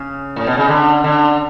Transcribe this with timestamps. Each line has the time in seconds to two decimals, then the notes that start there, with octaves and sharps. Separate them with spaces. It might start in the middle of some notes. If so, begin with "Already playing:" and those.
Already playing: C#3
0.36 A2
0.47 B2
0.57 C#3
0.68 D3
1.04 D3